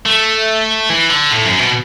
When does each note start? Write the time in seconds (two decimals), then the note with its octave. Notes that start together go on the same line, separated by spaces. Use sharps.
0.06 A3
0.90 E3
1.10 D3
1.31 A2
1.45 F#2
1.58 B2